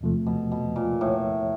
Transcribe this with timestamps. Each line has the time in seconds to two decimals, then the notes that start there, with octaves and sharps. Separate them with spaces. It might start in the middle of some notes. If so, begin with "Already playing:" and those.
0.01 E2 C3 F3 A3
0.26 B2
0.52 B2
0.76 A#2
1.01 A2